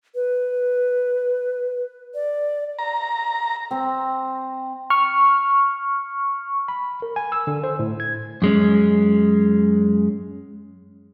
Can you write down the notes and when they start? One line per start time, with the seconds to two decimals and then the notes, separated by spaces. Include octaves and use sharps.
0.15 B4
2.14 D5
2.79 A#5
3.71 C4
4.90 C#6 F6
6.68 B5
7.02 A#4
7.16 G#5
7.32 E6
7.47 D3
7.64 C5
7.79 A2
8.00 G#6
8.42 F#2 G#3 C#4